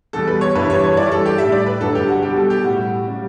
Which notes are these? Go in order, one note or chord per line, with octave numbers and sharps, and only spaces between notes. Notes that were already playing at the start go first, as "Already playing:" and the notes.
E2 B2 G3 A4
B4
C#5
G2 E3 G3 B4
C#5
C#5
G2 E3 G3 D5
A4
G4
A2 G3 E5
D5
B4
G2 D3 F#3 A4
G4
F#4
B2 G3 G4
A4
G4
A2 G3 F#4
C#3 G3